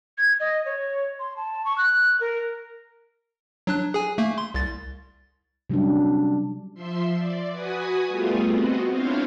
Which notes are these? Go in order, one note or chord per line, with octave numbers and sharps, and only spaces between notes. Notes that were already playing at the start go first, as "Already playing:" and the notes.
G#6
D#5
C#5
C6
A5
C#6
F#6
A#4
F#3 D4 F#6
G#4 G#5
A3 A#3
C6
C2 A6
C3 F#3 G3 C#4 D4
F3 E5 C6
D5
F#4 B4 G#5 D#6
G3 A3 B3 F4 G4 G#4
B3 C4 F#4 D#5
D4 E4 F4 C5 C#5 F5